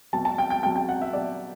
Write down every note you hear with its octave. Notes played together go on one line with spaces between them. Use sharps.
B2 F#3 A5
A5
G5
G5
B2 F#3 G5
G5
F#5
E5
B2 F#3 D5